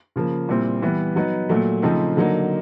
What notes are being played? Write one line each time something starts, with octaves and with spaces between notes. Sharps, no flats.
C#3 F3 A#3
A#2 G3 C4 E4
E3 G3 B3
F#3 B3 D#4
A#2 F#3 A3
C#3 F3 A3 C4 D#4
D3 F#3 A#3 D#4